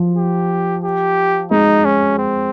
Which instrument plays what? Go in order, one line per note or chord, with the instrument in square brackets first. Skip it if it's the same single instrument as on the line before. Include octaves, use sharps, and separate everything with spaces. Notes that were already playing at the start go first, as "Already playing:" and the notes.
Already playing: [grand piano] F3
[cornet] G4
G4
[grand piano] G#3 [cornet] D#4
[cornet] C#4
C4